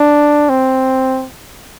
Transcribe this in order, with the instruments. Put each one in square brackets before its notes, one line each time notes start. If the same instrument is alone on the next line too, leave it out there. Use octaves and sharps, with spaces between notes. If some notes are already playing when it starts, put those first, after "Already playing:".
Already playing: [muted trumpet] D4
C4